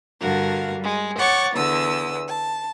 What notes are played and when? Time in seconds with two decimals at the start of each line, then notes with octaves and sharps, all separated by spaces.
0.21 G2 D3 F#4 A#4 F5
0.79 G3 G#3
1.18 C#5 F#5 C#6 D6 A6
1.55 E2 D3 D#6 E6
2.27 A5